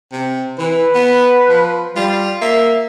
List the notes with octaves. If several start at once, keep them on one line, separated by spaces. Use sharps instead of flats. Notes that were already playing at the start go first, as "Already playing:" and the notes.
C3
E3 B4
B3
F3
G3 F4
A#3 E5